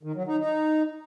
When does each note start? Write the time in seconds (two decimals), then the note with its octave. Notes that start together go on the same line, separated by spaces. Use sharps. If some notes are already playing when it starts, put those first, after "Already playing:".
0.03 D#3
0.15 F#3
0.27 D#4
0.39 D#4